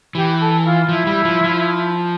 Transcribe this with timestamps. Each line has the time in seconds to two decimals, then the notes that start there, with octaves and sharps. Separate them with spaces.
0.15 E3 G4
0.40 A4
0.64 F4
0.88 F3 E4
1.07 G3
1.25 F3
1.44 F3